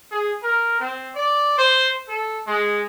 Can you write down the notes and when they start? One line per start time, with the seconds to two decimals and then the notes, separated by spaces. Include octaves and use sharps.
0.11 G#4
0.43 A#4
0.80 C4
1.15 D5
1.58 C5
2.09 A4
2.47 G#3